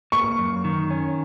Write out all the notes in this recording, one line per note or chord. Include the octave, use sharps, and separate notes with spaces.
A#3 C#6
F#2
D#3
C#4